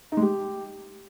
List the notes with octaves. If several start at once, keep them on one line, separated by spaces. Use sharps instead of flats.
D#4
G#3
G4